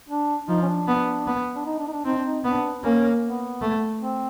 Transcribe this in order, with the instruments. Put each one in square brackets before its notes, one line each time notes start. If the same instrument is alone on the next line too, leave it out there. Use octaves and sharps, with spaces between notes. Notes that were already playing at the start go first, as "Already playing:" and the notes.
[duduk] D4
[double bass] F3 [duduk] D#4
[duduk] C#4
D4
[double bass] B3
B3
[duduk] D4
D#4
D4
D#4
D4
[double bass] C4 [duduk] D#4
[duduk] D4
D#4
[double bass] B3 [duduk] D4
[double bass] A#3 [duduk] C#4
[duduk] B3
[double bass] A3
[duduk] C4